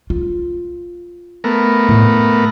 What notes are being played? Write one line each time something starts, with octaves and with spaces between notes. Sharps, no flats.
F4
A3 B3 A#4
A2